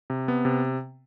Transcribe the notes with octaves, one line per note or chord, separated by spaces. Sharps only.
C3
B3
C3